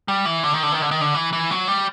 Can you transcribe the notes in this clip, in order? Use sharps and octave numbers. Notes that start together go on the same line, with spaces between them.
G3
E3
D3
D#3
D3
D#3
D3
D#3
D3
E3
E3
F#3
G3